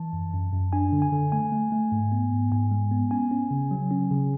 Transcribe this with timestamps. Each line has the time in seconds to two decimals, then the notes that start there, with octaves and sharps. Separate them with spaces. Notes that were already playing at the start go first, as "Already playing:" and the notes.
Already playing: E3 A5
0.13 F#2
0.33 F#2
0.53 F#2
0.73 D4 G#5
0.92 D3
1.02 G#5
1.12 D3
1.32 A3 G#5
1.52 A3
1.72 A3
1.92 G#2
2.12 B3
2.32 G#2
2.52 G#2 G#5
2.71 G#3
2.91 B3
3.11 C#4 G#5
3.31 C#4
3.51 C#3
3.71 F#3
3.91 C#4
4.11 C#3